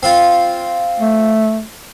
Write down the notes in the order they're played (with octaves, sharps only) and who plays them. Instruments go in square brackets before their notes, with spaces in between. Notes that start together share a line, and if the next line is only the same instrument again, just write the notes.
[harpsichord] C4 F4
[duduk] A3